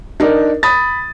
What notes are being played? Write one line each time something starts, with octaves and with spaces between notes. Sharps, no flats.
D4 D#4 A#4
B5 D#6 A6